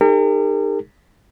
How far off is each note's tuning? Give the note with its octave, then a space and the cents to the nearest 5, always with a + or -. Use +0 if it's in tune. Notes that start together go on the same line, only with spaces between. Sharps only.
D#4 -20 G4 +45 A#4 -40